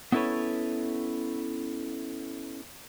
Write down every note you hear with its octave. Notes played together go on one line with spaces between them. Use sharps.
B3 C#4 E4 A4 B4 C#5